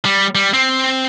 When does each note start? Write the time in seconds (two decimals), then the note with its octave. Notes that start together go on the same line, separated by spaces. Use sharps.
0.05 G3
0.35 G3
0.54 C4